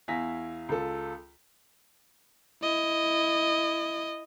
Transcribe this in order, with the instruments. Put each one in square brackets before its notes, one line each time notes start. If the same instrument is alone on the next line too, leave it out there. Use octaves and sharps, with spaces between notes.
[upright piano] E2 E4 F5 G#5 A#6 B6
C#2 F4 A4
[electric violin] E4 D#5